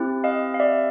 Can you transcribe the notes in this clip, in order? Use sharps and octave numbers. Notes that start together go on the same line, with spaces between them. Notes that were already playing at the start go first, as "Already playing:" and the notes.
Already playing: C4 E4 G4
D#5 F5
F5
D5 E5